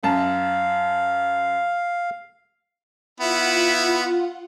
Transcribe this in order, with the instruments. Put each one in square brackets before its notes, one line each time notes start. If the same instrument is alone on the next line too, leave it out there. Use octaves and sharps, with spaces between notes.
[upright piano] F#2 A5 [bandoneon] F5
[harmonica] B3 E4 [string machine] F4 F#5